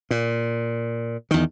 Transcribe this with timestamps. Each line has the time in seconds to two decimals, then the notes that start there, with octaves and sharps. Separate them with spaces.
0.11 A#2
1.31 E2 D#3